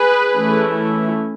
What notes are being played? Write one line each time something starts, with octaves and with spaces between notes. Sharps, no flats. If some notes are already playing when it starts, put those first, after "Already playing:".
Already playing: G#4 B4
E3 A3 C#4 E4